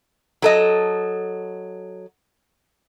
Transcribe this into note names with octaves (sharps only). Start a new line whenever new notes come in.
F#3 A4 D#5